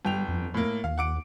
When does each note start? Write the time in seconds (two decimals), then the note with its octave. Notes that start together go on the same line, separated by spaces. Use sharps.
0.05 G1 G3 G5 F7
0.28 F2
0.54 A2 A#3
0.84 D#2 F5
0.98 F#5 D6 D7